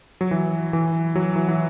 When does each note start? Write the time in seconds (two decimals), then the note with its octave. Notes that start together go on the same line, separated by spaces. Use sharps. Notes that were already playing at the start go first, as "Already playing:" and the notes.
0.21 F#3
0.31 E3
0.73 E3
1.15 F#3
1.36 E3
1.48 E3